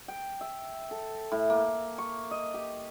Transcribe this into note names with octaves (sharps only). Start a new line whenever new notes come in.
G5
E5
A4
A2
A#3
C#6
D#5
G4